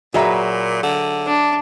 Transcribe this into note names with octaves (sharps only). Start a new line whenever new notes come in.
A#2 F#3 G#4 B4 E5 A#5
D3
D4